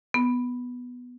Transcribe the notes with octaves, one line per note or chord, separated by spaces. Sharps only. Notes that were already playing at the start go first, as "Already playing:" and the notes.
B3